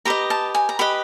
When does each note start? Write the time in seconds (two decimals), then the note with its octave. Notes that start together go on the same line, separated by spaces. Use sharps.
0.05 G4 B4 D#5 A#5
0.30 A5
0.55 G#5
0.69 A#5
0.79 G4 B4 D#5 B5